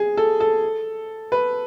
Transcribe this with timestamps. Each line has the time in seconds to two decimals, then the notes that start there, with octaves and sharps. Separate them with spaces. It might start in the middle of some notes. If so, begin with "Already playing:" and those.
Already playing: G#4
0.17 A4
0.40 A4
1.32 B4